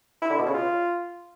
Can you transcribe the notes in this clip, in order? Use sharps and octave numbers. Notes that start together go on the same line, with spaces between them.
E4
D3
B2
C#3
F4